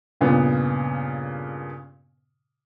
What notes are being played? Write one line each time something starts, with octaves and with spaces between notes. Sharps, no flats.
G2 A#2 C#3 B3